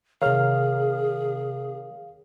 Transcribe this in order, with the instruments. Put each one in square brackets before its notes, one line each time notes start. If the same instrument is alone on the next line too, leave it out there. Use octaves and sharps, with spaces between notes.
[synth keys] C3 D#3 [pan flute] G#4 [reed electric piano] A#4 C#5 F6 [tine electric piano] F5